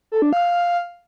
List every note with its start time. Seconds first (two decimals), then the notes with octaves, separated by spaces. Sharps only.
0.12 A4
0.22 D4
0.33 F5